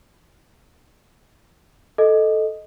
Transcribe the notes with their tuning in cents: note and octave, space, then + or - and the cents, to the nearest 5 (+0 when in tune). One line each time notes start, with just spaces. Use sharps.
A4 -5 D#5 +0